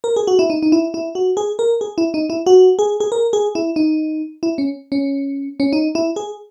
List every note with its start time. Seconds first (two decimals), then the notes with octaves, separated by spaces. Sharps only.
0.04 A#4
0.16 G#4
0.27 F#4
0.39 E4
0.50 D#4
0.63 D#4
0.72 E4
0.94 E4
1.15 F#4
1.37 G#4
1.59 A#4
1.81 G#4
1.98 E4
2.14 D#4
2.30 E4
2.46 F#4
2.79 G#4
3.00 G#4
3.12 A#4
3.33 G#4
3.55 E4
3.76 D#4
4.43 E4
4.58 C#4
4.92 C#4
5.60 C#4
5.73 D#4
5.95 E4
6.16 G#4